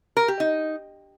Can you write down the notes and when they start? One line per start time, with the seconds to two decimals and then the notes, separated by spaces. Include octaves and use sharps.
0.17 A#4
0.28 G4
0.40 D#4